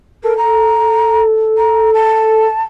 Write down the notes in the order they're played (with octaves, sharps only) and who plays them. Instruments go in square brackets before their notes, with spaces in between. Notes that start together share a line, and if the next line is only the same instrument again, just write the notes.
[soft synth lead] A4 [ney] A#4
[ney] A#5
A#5
A5